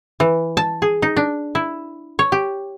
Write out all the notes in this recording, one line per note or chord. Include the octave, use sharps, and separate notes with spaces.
E3
A5
G#4
D#4
D4
E4
C#5
G4